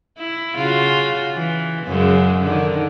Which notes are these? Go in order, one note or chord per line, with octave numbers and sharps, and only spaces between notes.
E4
C#3 F4 F#4
E3
F#2 C#3 G#3
D3 D#3